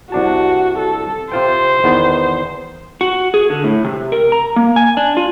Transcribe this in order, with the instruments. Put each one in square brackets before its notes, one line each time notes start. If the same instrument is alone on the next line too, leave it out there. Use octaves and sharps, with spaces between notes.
[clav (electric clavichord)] C2 D4 A5 [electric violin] F#4
[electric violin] A4
[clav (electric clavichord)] C3 F4 G5 [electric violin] C5
[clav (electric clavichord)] E2 D#3 B3
[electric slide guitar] F#4
G#4
D3
A2
C3
A#4
A#5
A#3
G#5
D4
F4